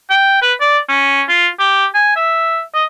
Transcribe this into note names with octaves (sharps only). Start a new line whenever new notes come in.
G5
B4
D5
C#4
F4
G4
G#5
E5
D#5